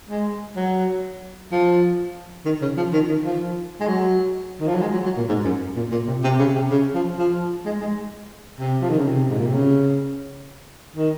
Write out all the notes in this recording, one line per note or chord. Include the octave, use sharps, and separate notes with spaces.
G#3
F#3
F3
D#3
C#3
F3
D#3
D#3
F3
G#3
F#3
D#3
F3
F#3
G#3
F#3
F#3
A#2
G#2
F#2
A#2
A#2
C3
C3
C#3
C3
C#3
F3
F3
G#3
G#3
C3
F3
D#3
C#3
C3
G#2
A#2
C3
C#3
D#3